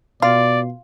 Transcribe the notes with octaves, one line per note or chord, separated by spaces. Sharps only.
B2 F4 D5